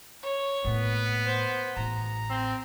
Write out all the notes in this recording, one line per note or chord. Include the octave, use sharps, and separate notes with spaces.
C#5
A2 A#3 B3
C5
A1 A#5
C4